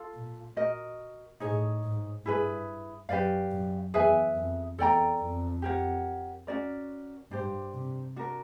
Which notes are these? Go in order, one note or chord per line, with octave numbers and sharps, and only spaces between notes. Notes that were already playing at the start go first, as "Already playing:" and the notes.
Already playing: F4 A4 F5
A#2
F#4 A#4 D#5
A2 D#4 G#4 C#5
G#2
G2 E4 G#4 B4
F#2 G4 B4 D5 F5
F#2
E2 G#4 B4 E5 G#5
F2
E2 A4 D5 G5 A#5
F2
G4 A#4 C#5 F#5
C#4 F#4 A#4 D5
G2 D4 G4 C5
C3
D4 F#4 A#4